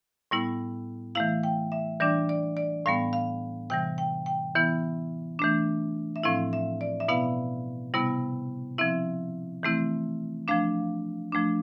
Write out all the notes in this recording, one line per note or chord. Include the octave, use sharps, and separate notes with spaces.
A2 G3 B3 E4
E3 A3 E4 F5
G5
E5
E3 G3 D4 D5
D5
D5
A2 G3 B3 F5
F5
C3 E3 G3 G5
G5
G5
E3 B3 E4
E3 A3 D4
E5
A2 F3 C4 E4 F5
E5
D5
E5
B2 B3 E4 F5
C3 G3 B3 E4
F3 C4 E4 E5
E3 A3 C4 E4
F3 A3 D4 F5
F3 A3 D4